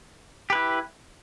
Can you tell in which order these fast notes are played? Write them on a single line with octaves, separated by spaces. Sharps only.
G4 B4 E4